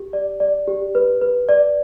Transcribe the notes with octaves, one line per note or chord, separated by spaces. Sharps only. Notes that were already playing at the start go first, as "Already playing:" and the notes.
Already playing: G4
D5
D5
G4
B4
B4
D5